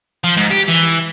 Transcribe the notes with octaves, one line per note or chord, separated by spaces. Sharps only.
F3
G#2
G4
E3